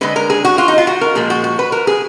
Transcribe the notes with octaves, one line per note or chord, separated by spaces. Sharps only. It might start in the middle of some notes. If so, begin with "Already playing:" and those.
D3 G#3 B4
A#4
G#4
F#4
F4
D#4
F4
F#4
A#4
A#2 F3 G#3 G#4
F#4
F#4
B4
A#4
G#4